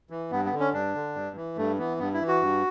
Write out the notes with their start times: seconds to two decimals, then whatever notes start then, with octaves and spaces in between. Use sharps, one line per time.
0.10 E3
0.31 G2 B3
0.45 B3
0.52 D3
0.60 C#4
0.73 G2 D4
0.95 D3
1.15 G2
1.36 E3
1.57 G2 A3
1.78 E3 B3
1.99 G2 B3
2.14 E4
2.21 E3
2.28 F#4
2.42 G2